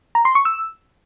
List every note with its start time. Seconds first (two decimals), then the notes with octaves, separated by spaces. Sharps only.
0.15 A#5
0.25 C6
0.35 C#6
0.45 E6